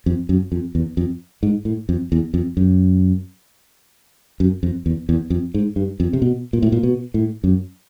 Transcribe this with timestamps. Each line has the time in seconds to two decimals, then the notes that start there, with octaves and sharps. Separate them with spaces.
0.06 F2
0.29 F#2
0.52 F2
0.75 E2
0.97 F2
1.43 G#2
1.65 A2
1.89 F2
2.12 E2
2.34 F2
2.57 F#2
4.40 F#2
4.63 F2
4.86 E2
5.09 E2
5.30 F2
5.54 G#2
5.76 G2
6.00 F2
6.13 C3
6.22 B2
6.53 A#2
6.62 A2
6.72 A#2
6.83 B2
7.14 A2
7.44 F#2